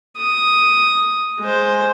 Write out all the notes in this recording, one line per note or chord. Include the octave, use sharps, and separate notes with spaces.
D#6
G#3 C5